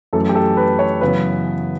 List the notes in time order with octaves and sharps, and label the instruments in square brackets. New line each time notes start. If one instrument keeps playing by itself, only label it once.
[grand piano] F#2 E3 A3 C#4 A4
G4
A4
B4
C#5
F#2 C#3 E3 B3 B4